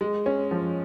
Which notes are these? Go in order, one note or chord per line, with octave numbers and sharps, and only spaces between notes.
G#3
C#4
F3